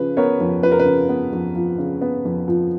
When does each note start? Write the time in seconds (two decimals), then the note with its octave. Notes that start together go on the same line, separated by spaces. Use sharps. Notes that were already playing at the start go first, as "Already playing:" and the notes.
Already playing: C#3 F3 B4
0.17 B3 A#4 C#5
0.41 F2
0.63 F3 B4
0.72 A#4
0.80 B4
0.86 C#3
1.09 B3
1.33 F2
1.55 F3
1.78 C#3
2.01 B3
2.25 F2
2.48 F3